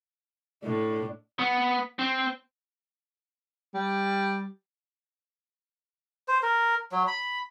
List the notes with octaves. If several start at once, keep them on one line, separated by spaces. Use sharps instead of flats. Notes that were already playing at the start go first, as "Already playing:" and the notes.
A2 D4
B3
C4
G3
C5
A#4
F#3
B5